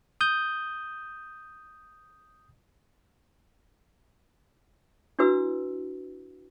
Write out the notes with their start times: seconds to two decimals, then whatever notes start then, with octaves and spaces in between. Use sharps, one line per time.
0.21 D#6 G6
5.19 D4 E4 F#4 B4 E6